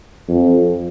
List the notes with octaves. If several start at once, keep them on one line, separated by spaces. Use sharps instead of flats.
F2